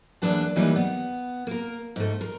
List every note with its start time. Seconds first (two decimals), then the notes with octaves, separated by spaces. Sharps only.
0.22 E2 F#3 A#3 D4 B4 A5
0.56 D#3 E3 F#3 G3 A#3 D#4
0.76 B3
1.47 A#3 A#4
1.96 G#2 A3
2.21 A#4